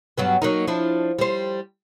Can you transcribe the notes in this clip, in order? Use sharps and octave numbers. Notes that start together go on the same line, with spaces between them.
G2 F#3 B3
F#3 A#3 D#4
F3 D4 E4
G3 C5